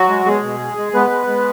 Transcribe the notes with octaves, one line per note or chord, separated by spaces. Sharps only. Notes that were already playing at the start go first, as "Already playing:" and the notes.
Already playing: F#3 F#4
G#3
B2 G#3 G#4
B2
G#3
G#3
G#3 B3 B4
G#3
G#3